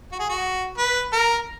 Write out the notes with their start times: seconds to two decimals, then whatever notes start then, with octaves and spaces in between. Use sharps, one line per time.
0.12 F#4
0.20 G#4
0.29 F#4
0.78 B4
1.13 A#4